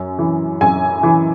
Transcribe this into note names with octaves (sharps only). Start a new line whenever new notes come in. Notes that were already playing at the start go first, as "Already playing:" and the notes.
Already playing: F#2
E3
F#2 G#5
E3